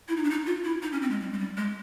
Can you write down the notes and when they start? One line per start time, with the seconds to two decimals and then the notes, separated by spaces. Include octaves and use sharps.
0.08 E4
0.16 D#4
0.24 D4
0.30 D#4
0.46 F4
0.64 E4
0.82 D#4
0.93 C#4
1.02 C4
1.11 G#3
1.20 G3
1.33 G#3
1.39 G3
1.57 G#3